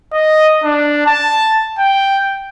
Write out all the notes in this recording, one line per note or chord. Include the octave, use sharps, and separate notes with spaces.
D#5
D4
A5
G5